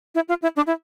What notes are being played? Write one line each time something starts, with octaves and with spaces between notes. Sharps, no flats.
E4
F4
E4
D4
E4